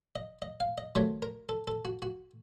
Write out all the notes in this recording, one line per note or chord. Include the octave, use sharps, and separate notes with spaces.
D#5
D#5
F5
D#5
C3 D#3 F#3 A3 C#5
A#4
A4
A4
F#4
F#4